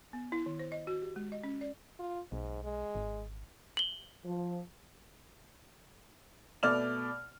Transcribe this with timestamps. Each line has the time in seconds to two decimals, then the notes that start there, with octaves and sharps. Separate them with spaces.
0.13 B3
0.32 E4
0.46 D#3
0.59 C5
0.72 D#5
0.87 F#4
1.02 G4
1.16 G#3
1.32 D#5
1.44 C#4
1.61 D5
1.99 F4
2.32 B1 G#2
2.64 G#3
2.95 G#1
3.77 F#7 G7
4.24 F3
6.63 B2 A3 D5 F6 F7